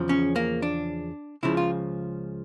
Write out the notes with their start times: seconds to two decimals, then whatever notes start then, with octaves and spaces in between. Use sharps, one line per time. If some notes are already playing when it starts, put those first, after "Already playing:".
Already playing: E2 C#3 F3
0.09 C#4
0.36 A#3
0.62 D4
1.43 C#2 C#3 F3 E4
1.57 F4